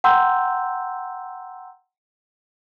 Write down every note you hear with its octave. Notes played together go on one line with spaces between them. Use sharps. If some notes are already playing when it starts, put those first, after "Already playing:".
F#5 G5 A#5 C6 E6 G6